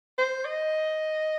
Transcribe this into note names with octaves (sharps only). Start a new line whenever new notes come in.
C5
D#5